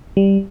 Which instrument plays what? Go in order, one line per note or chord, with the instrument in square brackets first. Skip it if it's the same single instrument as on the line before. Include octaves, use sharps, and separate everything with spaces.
[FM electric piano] G3